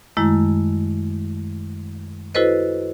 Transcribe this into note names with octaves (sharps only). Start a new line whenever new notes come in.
F#2 D#3 G#3 A3 E4
E4 F#4 A4 B4 C5 D#5